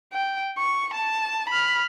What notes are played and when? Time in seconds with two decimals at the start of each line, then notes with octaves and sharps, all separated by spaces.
0.13 G5
0.58 C#6
0.94 A5
1.49 B5 F6